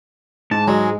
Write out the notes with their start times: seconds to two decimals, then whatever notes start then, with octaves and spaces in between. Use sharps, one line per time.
0.51 G#2 A5
0.68 F#3 G#3